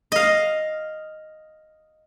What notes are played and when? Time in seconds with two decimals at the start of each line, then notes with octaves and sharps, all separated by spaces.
0.12 D#5 F5